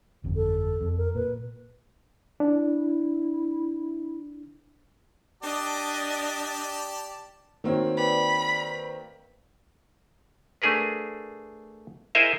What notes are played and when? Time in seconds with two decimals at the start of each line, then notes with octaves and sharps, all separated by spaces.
0.24 G1 F2
0.36 A4
0.81 F2
0.98 A#4
1.15 A#2 B4
2.40 D4 E4
5.43 D4 G4 D5 D#5 A5
7.64 D#3 A#3 C4 F#4 C#5
7.97 B4 D5 G5 B5
10.62 A3 D4 G#4 A#4 B4
12.15 E4 G#4 A#4 C5 D#5 E5